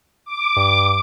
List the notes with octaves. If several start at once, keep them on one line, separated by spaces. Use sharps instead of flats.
D6
G2